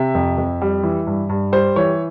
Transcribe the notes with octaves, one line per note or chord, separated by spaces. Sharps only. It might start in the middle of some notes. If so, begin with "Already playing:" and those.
Already playing: C3 E5
F2
F2
G3
E3
G2
G2
G3 C5
E3 C#5